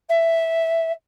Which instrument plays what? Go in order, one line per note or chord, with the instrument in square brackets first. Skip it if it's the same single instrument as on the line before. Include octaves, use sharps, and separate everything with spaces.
[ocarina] E5